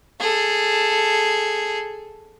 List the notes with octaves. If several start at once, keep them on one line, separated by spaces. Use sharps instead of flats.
G#4 A4